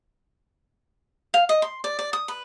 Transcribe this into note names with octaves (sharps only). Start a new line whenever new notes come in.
F5
D#5
C6
D5
D5
D#6
B4